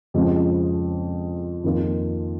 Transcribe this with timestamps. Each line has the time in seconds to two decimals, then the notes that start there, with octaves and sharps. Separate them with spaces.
0.14 F2 C#3 F3 G#3
1.64 F2 D#3 A#3 F4